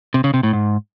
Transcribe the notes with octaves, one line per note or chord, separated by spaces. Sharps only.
C3
C#3
C3
A2
G#2